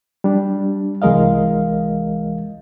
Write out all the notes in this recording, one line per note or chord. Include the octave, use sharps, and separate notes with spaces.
G3 D4
C2 E3 G#3 A#4 D#5 F5